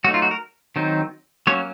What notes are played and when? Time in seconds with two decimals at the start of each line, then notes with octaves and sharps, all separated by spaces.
0.04 F#3 A3 D#4 F#4
0.14 F4
0.22 F#4
0.31 A#4
0.76 D#3 F#3 C4 D#4
1.47 F#3 A#3 C#4 C#5